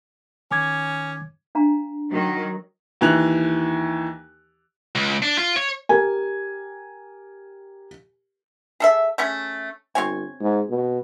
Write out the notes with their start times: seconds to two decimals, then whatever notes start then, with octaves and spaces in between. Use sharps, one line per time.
0.51 D#3 C#4 D6 G#6
1.55 D4 F5 A#5
2.10 D#3 F#3
3.01 D#2 E3 F#6 F7
4.95 C#2
5.22 D4
5.38 F4
5.56 C#5
5.89 G4 A#4 G#5
8.80 G#4 A4 E5
9.18 A3 C#4 G#4
9.95 G1 C4 C#5 G#5
10.41 G#2
10.70 B2